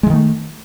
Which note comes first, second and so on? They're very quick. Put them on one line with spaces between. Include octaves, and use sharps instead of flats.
G#3 E3 D#3 A3